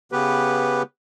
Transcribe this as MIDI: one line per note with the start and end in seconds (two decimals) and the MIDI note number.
0.12 0.82 49
0.12 0.82 59
0.12 0.82 67
0.12 0.82 71